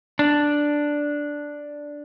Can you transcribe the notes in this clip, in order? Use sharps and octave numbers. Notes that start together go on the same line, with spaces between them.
D4